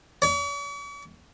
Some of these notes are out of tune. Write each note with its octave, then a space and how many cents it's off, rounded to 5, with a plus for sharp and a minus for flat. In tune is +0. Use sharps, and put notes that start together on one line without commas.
C#5 +45